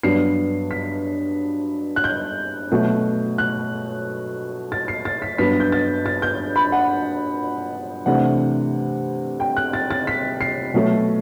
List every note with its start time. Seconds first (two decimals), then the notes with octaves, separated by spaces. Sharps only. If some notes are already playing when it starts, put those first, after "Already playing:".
0.03 G2 F#3 B3 D4 C7
0.71 B6
1.96 F#6
2.04 G6
2.72 B2 F#3 A3
3.38 F#6
4.72 A6
4.88 C7
5.05 A6
5.22 B6
5.38 G2 F#3 B3 B6
5.60 G6
5.72 A6
6.06 A6
6.22 G6
6.56 B5
6.72 F#5
8.06 C3 E3 A3 D4 F#5
9.40 G5
9.57 F#6
9.73 A6
9.91 A6
10.07 B6
10.41 C7
10.74 B2 F#3 A3